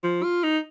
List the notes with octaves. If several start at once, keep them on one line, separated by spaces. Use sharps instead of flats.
F3
F4
D#4